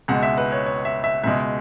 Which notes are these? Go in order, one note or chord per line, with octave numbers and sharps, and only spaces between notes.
C#2 B2 G#3 F#5
E5
B4
C#5
C#5
E5
E5
C#2 B2 G#3 E5